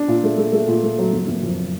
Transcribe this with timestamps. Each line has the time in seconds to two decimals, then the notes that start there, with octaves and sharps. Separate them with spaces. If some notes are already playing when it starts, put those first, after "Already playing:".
Already playing: D4
0.08 A#2
0.23 A3
0.38 A3
0.52 A3
0.68 A#2
0.83 A3
0.99 F#3
1.13 F#1
1.28 F#1
1.43 F2